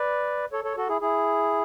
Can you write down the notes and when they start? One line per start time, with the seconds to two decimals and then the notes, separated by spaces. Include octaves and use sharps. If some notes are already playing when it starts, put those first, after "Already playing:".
Already playing: B4 D5
0.53 A4 C#5
0.64 A4 C#5
0.77 F#4 A4
0.89 E4 G#4
1.01 E4 G#4